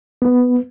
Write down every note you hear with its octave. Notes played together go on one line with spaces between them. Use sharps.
B3